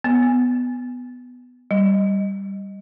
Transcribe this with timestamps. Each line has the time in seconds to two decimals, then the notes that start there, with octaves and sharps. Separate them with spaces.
0.04 B3
1.71 G3